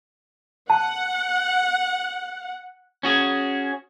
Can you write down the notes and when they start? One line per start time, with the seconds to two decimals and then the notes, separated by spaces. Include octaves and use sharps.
0.70 F#5 A5
3.03 C#4 F#4 G#4